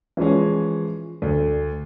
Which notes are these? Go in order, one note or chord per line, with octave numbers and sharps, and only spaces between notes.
E3 F3 G#3 C#4
D2